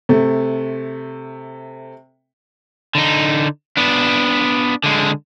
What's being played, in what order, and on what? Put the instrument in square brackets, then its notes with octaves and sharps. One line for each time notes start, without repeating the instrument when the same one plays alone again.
[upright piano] C3 A3
[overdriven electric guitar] D3 D#4
B3 D4
D3 G#3